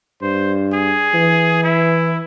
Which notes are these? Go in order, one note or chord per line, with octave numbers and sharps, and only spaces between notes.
G2 C5
G#4
E3
E4